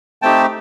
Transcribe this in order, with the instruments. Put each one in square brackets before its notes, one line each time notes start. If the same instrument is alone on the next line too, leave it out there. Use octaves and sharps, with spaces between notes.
[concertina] A3 C4 D#4 G4 G5 A5